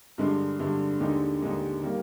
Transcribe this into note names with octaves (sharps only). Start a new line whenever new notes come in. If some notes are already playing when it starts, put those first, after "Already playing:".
G2 D3 G#3
G2 D3 G#3
D#2 D3 G#3 D#4 G4
D#2 D3 G#3 D#4 G4
D#3 G3 A#3